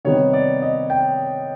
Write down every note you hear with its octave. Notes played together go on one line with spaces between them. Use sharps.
C3 D#3 G3 B3 C#5
D5
D#5
G5